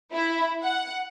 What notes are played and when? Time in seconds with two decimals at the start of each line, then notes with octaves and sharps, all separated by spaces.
0.12 E4
0.62 F#5